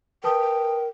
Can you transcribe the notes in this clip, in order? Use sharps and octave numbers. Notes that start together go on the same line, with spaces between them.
A#4 B4 G5 A5 D#6